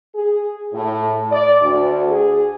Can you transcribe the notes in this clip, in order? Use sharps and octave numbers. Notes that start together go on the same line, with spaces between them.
G#4
A2
D5
D2
G#4